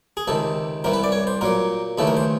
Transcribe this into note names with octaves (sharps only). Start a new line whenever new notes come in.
G#4
C#2 C3 D#3 A4
C2 C3 E3 A#4
B4
D5
C#5
C5
A#2 F#3 A#3 A#4
D#2 C#3 E3 A3 A4
A#4
C5